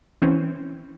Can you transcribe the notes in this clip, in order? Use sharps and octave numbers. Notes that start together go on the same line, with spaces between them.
E3 C4 C#4